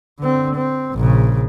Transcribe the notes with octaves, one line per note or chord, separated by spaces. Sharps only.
D3 C4
C4
A#1 C#3